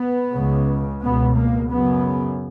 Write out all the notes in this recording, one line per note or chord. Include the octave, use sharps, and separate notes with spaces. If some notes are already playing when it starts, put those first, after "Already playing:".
Already playing: B3
C#2 C#3
C#2 B2 B3
A#3
F#2 C#3 B3